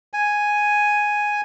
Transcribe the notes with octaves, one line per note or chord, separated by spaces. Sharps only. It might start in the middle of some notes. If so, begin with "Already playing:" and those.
G#5